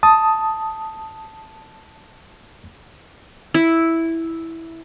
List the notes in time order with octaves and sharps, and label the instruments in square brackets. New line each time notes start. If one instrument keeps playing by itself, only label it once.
[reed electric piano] A5 D#6
[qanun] E4